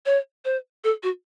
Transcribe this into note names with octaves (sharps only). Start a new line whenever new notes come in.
C#5
C5
A4
F#4